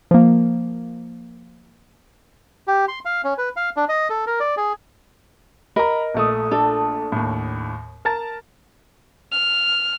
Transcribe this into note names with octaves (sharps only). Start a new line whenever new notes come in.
F3 A#3
G4
C6
F5
C#4
B4
F5
D4
D#5
A4
A#4
D5
G#4
A#4 D#5 A#5 B5
A#1 A3 D#6
D4 A4
D#2 A2
A#4 A5 A6
F6